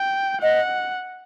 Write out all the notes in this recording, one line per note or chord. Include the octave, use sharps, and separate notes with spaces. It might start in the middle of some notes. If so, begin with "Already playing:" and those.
Already playing: G5
D#5 F#5